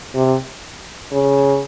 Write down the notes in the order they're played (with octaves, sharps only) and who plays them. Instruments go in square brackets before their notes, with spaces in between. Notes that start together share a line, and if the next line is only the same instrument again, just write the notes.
[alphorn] C3
C#3